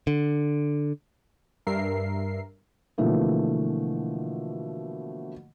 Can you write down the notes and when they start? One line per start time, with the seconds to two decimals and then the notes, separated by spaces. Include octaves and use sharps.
0.07 D3
1.67 G2 A#4 E5 C7
2.98 B2 D3 E3 F3 A3 A#3